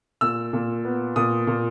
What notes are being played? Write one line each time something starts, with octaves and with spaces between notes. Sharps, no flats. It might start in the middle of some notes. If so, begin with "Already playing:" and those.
A#2 E6
A#2
B3
A#2 D#6
A#2